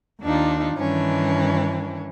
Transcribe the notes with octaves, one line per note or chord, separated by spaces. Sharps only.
D#2 D4 D#4 F4
G2 D#3 E3 C#4 D4